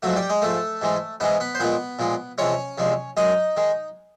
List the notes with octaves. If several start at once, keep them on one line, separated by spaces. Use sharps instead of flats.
G#2 F3 F#3 A3 F#4
G3 G4
G#3 G#4
G#2 F3 A3 A4
G#2 E3 G#3
G#2 E3 G#3 B3 B4
B3 B4
C5
A#2 F3 G#3 B3 B4
A#2 F3 G#3
E2 C3 F3 G#3 C#4 C#5
E2 C3 F3 G#3
F#2 D#3 G#3 D#4 D#5
D#3 G#3